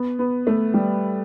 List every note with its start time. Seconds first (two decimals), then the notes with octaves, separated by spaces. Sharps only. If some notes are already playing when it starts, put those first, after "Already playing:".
Already playing: B3
0.19 B3
0.47 A3
0.74 G3